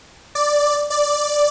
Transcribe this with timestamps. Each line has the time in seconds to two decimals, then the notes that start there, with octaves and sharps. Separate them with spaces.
0.35 D5
0.90 D5